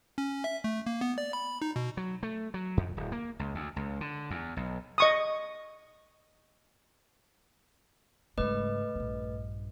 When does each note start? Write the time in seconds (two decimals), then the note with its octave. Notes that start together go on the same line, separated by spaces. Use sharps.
0.18 C#4
0.44 E5
0.64 A3
0.86 A#3
1.01 B3
1.18 D5
1.33 B5
1.62 D#4
1.76 B2
1.97 F#3
2.23 A3
2.54 F#3
2.77 F2
2.97 D1
3.12 A#3
3.39 C#2
3.55 D2
3.76 C#2
4.01 D3
4.31 E2
4.57 B1
4.98 D#5 C#6 D#6
8.38 G#2 C#3 A3 B4 D#5
8.96 A#1 G2